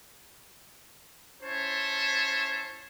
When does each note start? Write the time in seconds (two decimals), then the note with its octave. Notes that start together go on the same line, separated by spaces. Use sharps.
1.42 C#4 E4 C5 C#5 A5